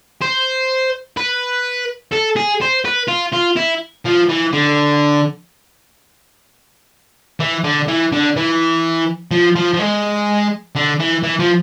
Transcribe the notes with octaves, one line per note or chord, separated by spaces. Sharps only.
C5
B4
A4
G#4
C5
B4
F4
F4
E4
F3
E3
D3
E3
D3
E3
D3
E3
F3
F3
F3
G#3
D3
E3
E3
F3